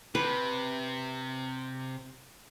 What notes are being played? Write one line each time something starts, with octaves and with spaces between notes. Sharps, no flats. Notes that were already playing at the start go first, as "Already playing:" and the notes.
C3 B4